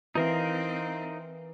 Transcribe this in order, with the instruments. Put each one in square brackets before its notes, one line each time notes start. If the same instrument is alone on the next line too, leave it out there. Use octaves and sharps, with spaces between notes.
[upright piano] E3 [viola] C4 [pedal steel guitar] D#4 A#4 F5